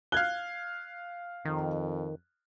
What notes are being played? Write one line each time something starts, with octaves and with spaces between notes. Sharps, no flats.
F5 F#6 G#6 G7
F2 D#3